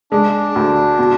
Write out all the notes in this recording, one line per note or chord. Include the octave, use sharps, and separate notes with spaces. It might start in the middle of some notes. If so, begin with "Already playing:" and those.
G#3 D4
D2
B2